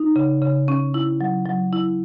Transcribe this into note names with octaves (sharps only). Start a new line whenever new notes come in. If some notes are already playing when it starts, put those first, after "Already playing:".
Already playing: D#4
C#3
C#3
C#4
E4
F#3
F#3
E4